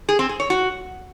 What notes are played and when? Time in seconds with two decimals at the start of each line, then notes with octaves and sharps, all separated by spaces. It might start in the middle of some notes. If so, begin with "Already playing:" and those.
0.09 G#4
0.19 C4
0.29 G#4
0.40 C#5
0.50 F#4